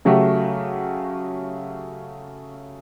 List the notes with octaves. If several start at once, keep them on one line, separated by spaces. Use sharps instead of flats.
C#3 F#3 A3 F#4 G4